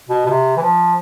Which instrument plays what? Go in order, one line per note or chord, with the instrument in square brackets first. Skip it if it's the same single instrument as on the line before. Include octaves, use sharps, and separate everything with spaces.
[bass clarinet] B2
B2
C3
E3
F3